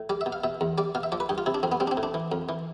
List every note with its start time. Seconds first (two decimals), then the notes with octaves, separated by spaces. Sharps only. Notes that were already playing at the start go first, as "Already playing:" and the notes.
Already playing: A2
0.10 G3 D5
0.21 E5
0.26 B2
0.32 F5
0.44 B2 E5
0.61 E2
0.78 G3 D5
0.95 B2 F5
1.03 E5
1.12 F3 D5
1.20 B4
1.29 G2 G4
1.38 F4
1.46 C3 E4
1.54 D4
1.63 F2 C4
1.72 B3
1.80 G3 C4
1.87 D4
1.91 C4
1.97 A2
2.03 D4
2.14 E3
2.32 F2
2.49 E3